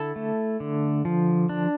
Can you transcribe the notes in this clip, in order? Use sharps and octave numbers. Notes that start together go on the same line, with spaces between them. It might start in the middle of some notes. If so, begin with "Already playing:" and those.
Already playing: D3 E4 A4 A5
A3
D3
F3
D4